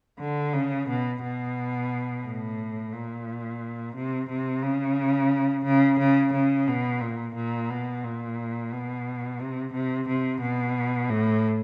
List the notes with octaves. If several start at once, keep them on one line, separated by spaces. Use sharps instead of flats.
D3
C#3
B2
B2
A2
A#2
C3
C3
C#3
C#3
C#3
C#3
B2
A#2
A#2
B2
A#2
B2
C3
C3
C3
B2
A2